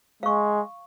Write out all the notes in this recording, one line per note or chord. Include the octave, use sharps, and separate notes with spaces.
G#3 F5 C#6